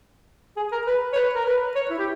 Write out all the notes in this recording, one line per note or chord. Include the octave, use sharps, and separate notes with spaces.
G#4
A#4
B4
C#5
B4
A#4
B4
C#5
E4
G4